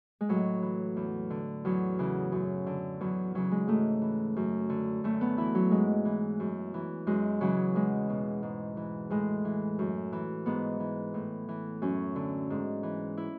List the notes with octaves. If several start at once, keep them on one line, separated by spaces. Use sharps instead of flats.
G#3
A2 F#3
E3
E2
D3
E2 F#3
C#3 E3
F#2
D3
E2 F#3
C#3 E3 F#3
G#3
G#2 A3
E3
F#2
D3
F#2 A3
B3
E3 E4
F#3
G#2 G#3
E3
F#2
E3
F#2 G#3
C#3 E3 F#3
E2 G#3
B2
G#2
E3
A2 G#3
E3
F#2
E3
G#2 B3
E3
A2
E3
F#2 C#4
D3
G#2
E3
E4